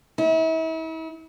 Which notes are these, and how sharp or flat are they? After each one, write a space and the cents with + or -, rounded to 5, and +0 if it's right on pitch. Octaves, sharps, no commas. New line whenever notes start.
E4 -40